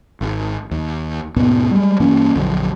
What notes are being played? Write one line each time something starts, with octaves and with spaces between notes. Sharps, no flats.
G#1
D#2
D#2 G#2 B2 B3
G3 G#3
G2 E3 A#3 C#4
A#1 F2 D3 F#3